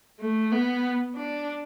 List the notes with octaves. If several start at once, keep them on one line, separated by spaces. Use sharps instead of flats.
A3
B3
D4